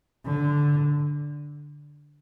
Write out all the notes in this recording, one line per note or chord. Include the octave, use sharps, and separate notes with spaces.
D3